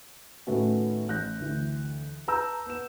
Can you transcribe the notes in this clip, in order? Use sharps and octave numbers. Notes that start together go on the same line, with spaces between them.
A2 D#3 A3 B3 C#4 F#4
A1 F#6 G6 A#6
D2 E3
B4 A5 A#5 E6 G6
B3 E7